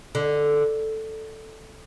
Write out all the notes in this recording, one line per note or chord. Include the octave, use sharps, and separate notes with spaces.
D3